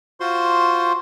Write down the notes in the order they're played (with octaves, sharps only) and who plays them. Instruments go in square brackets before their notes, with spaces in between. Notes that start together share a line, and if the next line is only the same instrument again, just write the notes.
[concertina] F4 F#4 C5 C6